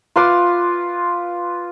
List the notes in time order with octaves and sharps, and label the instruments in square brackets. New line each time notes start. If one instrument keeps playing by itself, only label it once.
[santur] F4 B4 C6 D6